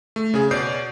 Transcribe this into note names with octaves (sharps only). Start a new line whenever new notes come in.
A3
C#3 G#4
B2 C#5 D5 G6 C7